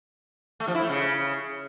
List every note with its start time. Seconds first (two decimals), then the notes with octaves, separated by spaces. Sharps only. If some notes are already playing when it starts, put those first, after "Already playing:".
0.60 A3
0.67 F3
0.75 E4
0.82 A3
0.89 C#3